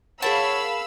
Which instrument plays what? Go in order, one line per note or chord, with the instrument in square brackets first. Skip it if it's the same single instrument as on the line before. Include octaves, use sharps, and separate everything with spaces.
[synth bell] G#4 A#4 F#5 [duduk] C#5 [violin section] F5 B5 E6 [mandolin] A5